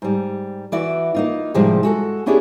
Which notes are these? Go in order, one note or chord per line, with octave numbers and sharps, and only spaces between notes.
G#2 G3
E3 E4 F#4 D5
A#3 D#4 F4
A2 C3 D#3 F3 G3 G#3
G#3 F#4 A4
B3 C#4 D4 E4 G4 G#4